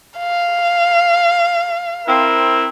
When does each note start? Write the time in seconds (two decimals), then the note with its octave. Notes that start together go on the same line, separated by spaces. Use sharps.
0.19 F5
2.07 C4 E4 A#4